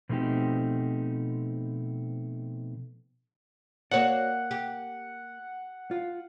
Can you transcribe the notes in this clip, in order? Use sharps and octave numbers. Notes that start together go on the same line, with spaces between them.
B2 F3 A3 C4 D#4 G4
A#3 F#4 C#5 D5 F#5
G4
F4